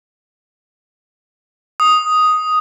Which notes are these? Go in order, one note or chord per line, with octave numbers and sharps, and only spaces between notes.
D#6